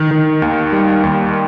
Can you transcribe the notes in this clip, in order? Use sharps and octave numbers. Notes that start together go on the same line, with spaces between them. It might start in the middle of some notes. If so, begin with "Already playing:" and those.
Already playing: D#3
D#3
D#2
G3
D#2